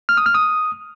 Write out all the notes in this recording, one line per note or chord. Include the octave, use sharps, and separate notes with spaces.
F6
D#6
F6
D#6